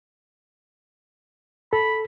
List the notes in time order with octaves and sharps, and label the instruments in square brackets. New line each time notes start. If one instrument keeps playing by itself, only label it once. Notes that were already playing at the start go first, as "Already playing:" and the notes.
[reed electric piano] A4 [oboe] B5